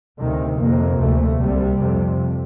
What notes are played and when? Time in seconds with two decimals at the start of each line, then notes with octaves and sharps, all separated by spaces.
0.20 D2 C3 D#3
0.59 F2 C3 A#3
0.99 D2 C3 A3
1.39 C2 C3 G3
1.79 F2 C3